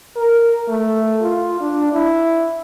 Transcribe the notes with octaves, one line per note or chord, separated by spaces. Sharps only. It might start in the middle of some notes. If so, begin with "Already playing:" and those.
A#4
A3
F4
D4
E4